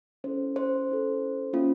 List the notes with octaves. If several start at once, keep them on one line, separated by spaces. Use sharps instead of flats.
C#4 E4 A4 C5
C5
C#4 E4 A4
A#3 C#4 F4